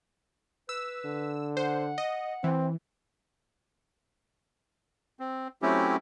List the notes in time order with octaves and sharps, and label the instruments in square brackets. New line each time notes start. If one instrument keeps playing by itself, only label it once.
[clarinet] B4 [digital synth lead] E6
[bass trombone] D3
[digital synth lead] C5 [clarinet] F#5
[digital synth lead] D#5
[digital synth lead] E3 [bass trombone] C4
[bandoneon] C4
F#3 A3 C4 C#4 E4 G4